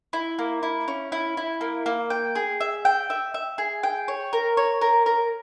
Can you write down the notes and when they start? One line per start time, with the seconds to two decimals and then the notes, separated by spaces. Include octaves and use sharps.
0.13 E4
0.39 A#3
0.63 E4
0.88 C#4
1.12 E4
1.37 E4
1.61 A#3
1.86 A#3
2.10 G5
2.35 G#4
2.61 E5
2.85 G5
3.10 E5
3.34 E5
3.58 G#4
3.83 G5
4.08 C#5
4.33 A#4
4.57 C#5
4.81 A#4
5.06 A#4